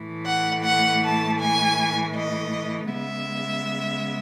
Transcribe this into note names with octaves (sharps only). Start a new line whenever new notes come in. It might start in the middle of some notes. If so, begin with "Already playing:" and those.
Already playing: A2 E3 A3
F#5
F#5
A5
G#5
D#5
C#3 G#3 B3 E5